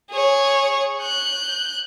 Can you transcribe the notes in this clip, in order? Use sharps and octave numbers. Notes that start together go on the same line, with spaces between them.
G#4 C#5
F#6 G6